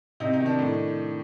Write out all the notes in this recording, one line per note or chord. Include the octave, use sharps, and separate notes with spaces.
C3 D#4
D#4
D#3
D4
A2